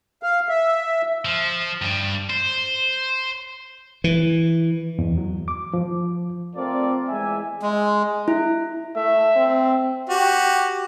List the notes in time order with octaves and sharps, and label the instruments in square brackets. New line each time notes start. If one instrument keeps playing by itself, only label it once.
[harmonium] F5
E5
[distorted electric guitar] F3
G2 G3
C5
[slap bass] E3
[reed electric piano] E2
F#3
D6
F3
[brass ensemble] A3 C4 F4 A4 A#4 D5
E2 G#3 E5 G#5
[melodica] G#3
[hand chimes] E4
[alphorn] A3 [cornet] E5
[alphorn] C4
[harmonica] F#4 G4